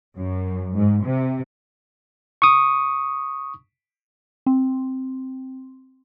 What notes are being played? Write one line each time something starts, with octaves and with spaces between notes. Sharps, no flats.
F#2
G#2
C3
C#6 D#6
C4